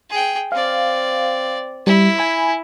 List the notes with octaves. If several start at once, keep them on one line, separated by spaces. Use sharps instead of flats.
G#4 G5
C4 D5 F5
G3 E4
G#5 B5